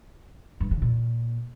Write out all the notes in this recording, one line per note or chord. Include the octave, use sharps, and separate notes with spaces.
G2
C#3
A#2